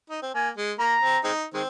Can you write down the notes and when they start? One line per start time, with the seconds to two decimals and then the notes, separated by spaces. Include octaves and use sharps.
0.10 D#4
0.22 C4
0.35 A#3 G#5
0.57 G#3
0.79 A#3 A#5
1.02 C4
1.24 G#3 C4 D#4
1.54 D#3 G#3 C4